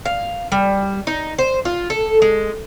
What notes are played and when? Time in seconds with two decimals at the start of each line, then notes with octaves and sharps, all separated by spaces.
0.05 F5
0.52 G3
1.07 D#4
1.38 C5
1.65 F4
1.90 A4
2.22 G#3